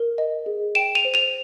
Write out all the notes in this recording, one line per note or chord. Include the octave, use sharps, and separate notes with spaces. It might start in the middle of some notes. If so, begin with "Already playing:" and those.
Already playing: A#4
D#5
G#4
G5 D7 E7
D#7 F7
C5
D#7 F7